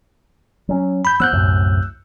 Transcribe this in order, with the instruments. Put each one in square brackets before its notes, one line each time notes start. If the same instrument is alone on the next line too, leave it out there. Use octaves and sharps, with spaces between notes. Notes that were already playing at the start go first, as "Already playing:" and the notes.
[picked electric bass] F#3 C#4
[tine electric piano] B5 G6
[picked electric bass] F3 B3 [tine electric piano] E6 F#6 G6
[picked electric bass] C2 F#2 A2